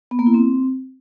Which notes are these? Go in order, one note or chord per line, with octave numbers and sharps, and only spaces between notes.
B3
A#3
E4
C4